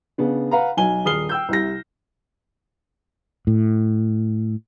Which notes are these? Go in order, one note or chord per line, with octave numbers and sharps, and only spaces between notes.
C#3 B3 D4
B4 F5 F#5 A#5
B1 G#5 G7
D#1 G#4 D#6 F6 C7 G7
G5 E6 G6
C2 C3 A#6
A2